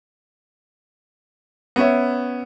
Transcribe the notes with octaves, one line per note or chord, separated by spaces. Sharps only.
B3 C#4 C#5 E5